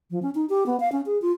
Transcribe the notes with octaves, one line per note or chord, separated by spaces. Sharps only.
F3
C#4
D#4
G4
B3
F5
C#4
G#4
F4